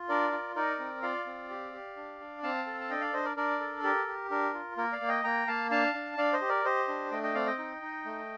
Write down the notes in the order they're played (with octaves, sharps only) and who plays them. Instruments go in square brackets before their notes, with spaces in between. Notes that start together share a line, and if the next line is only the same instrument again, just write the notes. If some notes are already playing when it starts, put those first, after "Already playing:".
Already playing: [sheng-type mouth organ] F4
D4 A#4 D5
F4
D#4 A#4 D5
C4
F4 D5 F5
C4
G4
G4
D4
D4
C4 F5 A5
A4
A5
D4 D#5 G5
D5 F5
D4 C5 D#5
A#4 D5
D4 A#4 D5
A4
G4 A#4
G4
D4 A#4
F4
A#3 A#4
D5 F5
A#3
D#5 G5
A#3 G5 A#5
A#3 F5 A5
D4 F5 A5
D4
D4 D5 F5
C5 D#5
G4
A#4 D5
G4 C5 D#5
D4
A3 D#5 G5
D#5 G5
C4 D5 F5
D#5 G5
D#4
D#4
A3